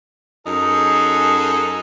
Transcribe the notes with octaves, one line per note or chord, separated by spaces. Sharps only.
F#2 D#4 G#4 A4